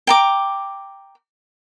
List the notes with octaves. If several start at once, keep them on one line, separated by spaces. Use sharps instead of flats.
G5 A#5 D6